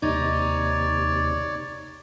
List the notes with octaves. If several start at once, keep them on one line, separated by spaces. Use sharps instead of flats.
D#2 C3 D#4 C#5 D5